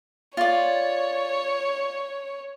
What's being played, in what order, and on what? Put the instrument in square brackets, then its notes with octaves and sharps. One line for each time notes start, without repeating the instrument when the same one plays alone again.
[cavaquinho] F4 D5 [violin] C#5